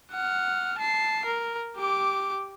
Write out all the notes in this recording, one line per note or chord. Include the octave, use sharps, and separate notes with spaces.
F#5 F6
A5 C7
A#4
G4 D6